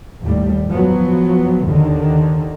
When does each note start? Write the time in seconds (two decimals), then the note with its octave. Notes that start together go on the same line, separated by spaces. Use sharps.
0.22 D#2 A2 G3
0.69 F3 F#3 B3
1.67 D#2 D3 D#3